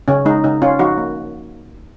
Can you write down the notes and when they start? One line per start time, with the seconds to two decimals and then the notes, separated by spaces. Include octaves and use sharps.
0.08 C#3 C#4
0.25 G#3 D#4
0.44 C#3 D#4
0.62 C#4 F4
0.79 F3 D#4 F#4
0.98 A#3